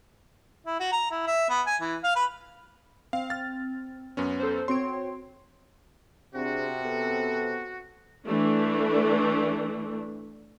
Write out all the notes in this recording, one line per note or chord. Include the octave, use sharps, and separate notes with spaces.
E4
F#4
A#5
E4
E5
B3
G#5
E3
F5
B4
C4 F5
F6 A6
F#2 B3 C#4
A4 C5
C4 F#4 C#5 C6 D7
C3 C4 D4 F#4 G#4
B3 C4 A4
E3 A3 D4